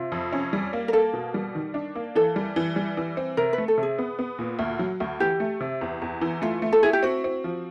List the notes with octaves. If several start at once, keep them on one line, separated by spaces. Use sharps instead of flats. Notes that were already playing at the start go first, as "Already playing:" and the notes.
Already playing: C3 F4
F2
C#4
G3
A#3
A#4
A#3 A4
B2
G3
D#3
D4
A#3
E3 A4
G3
E3
G3
E3
C4
C3 A#4
B4
A3
A4
C3
G#4
B3
B3
A#2
D2
F#3
D2
E3 G4
A3
C3
E2
E2
E3
A3 F4
A3
A4
E4 G#4
G4
C4 F#4
C4
F3